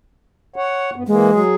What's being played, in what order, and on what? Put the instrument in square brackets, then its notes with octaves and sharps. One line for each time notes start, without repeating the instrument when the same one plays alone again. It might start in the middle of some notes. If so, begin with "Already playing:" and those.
[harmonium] C#5 F#5
G2 B3
[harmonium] E3 A#3 [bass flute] G#3
[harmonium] F#3 G#4